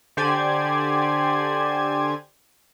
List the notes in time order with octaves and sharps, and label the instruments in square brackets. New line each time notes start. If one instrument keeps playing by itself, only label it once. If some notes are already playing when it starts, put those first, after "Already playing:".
[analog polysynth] D3 G4 C5 D5 G#5 G#6